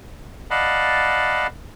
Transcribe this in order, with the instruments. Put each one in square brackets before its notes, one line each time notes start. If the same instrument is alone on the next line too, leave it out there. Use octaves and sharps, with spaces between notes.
[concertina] D5 D#5 F5 F#5 A5 B5